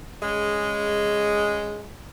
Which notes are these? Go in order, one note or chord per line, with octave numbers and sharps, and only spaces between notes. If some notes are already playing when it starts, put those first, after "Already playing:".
C#3 G#3